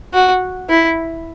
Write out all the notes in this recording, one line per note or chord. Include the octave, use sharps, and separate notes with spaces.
F#4
E4